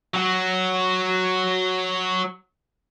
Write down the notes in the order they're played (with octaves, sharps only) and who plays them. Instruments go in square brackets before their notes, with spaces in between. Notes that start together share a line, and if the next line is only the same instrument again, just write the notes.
[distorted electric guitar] F#3 F#4